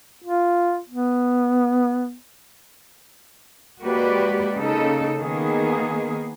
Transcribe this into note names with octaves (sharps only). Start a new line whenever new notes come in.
F4
B3
G#3 A#3 F#4 G4 B4 D5
C#3 A#3 D#4 A4
D#3 A#3 B3 G#4